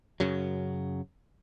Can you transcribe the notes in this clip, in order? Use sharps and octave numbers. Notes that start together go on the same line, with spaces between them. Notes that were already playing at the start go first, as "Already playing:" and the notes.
F#2 C#3 F#3